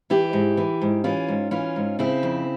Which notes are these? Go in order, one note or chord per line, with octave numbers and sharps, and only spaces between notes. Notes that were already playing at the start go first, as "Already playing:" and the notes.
E3 E4 G4
G#2
E3
G#2
E3 C#4 F4
G#2
E3 C#4 F4
G#2
C#3 C4 E4
F2